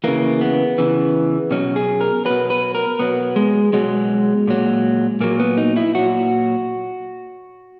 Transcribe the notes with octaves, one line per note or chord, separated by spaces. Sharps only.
C#3 E3 A#3
B3
C#3 E3
B2 F#3 C#4
G#4
A#4
B2 F#3 B4
B4
A#4
B2 F#3 B3
G#3
B2 F#3 G#3
A#2 F#3
A#2 F#3 A#3
B3
D#4
E4
A#2 F#3 F#4